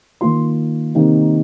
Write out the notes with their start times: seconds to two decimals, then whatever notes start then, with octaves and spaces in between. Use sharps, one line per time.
0.21 D#3 A#3 F4 C6
0.95 C3 D#3 A#3 D#4